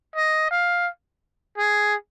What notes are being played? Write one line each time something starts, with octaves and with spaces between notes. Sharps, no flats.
D#5
F5
G#4